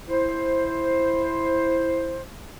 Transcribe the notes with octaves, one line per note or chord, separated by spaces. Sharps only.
E4 C5